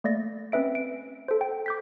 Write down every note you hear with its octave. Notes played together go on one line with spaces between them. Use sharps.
A3 A#3 D5 A#6
C4 C#4 B4 E5 D7
D7
A4 C5
G5
D6 G6 B6